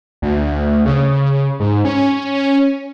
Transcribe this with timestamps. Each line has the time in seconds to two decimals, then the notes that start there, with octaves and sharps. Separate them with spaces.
0.22 D2
0.86 C#3
1.60 G#2
1.85 C#4